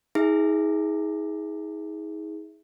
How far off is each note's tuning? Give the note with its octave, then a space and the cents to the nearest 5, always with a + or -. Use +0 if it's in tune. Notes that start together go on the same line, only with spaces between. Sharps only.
D#4 +45 G#4 +0 E5 +0